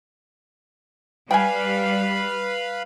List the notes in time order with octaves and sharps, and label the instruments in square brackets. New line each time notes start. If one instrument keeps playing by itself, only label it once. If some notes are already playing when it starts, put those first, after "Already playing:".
[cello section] G3 [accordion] B4 F5 B5 [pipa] G5 G#5